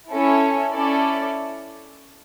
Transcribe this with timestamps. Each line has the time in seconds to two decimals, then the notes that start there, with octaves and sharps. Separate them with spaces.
0.12 C#4 E4 A4
0.74 C#4 E4 A4 D5